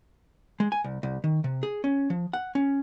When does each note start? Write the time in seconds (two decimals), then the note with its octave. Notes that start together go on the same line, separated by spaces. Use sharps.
0.60 G#3
0.72 G#5
0.84 C2
1.03 C2
1.24 D#3
1.44 C3
1.63 G#4
1.84 C#4
2.10 F3
2.33 F#5
2.55 C#4